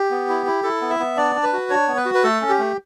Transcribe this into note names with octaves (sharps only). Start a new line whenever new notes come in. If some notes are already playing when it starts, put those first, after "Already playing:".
Already playing: G4
B3
E4
E4
E4 A4
B3
E5
B3
D4 D5
D4
B4
F#4
D4 C#5
B3
B4
F#4
B4
A3 A4
C#4
G4
A3